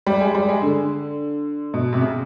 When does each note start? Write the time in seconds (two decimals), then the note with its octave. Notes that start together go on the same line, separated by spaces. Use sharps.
0.07 G3
0.21 G#3
0.35 G3
0.49 G#3
0.62 D3
1.74 B2
1.93 C3
2.01 C#3